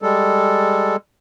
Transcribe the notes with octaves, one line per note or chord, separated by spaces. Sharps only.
G3 G#3 A4